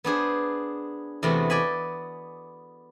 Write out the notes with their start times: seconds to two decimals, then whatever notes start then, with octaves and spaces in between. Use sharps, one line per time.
0.04 B3 D4 G#4 C5
1.23 E2 C3 A3 B3 C4 F#4
1.50 D5 D#5 G#5 B5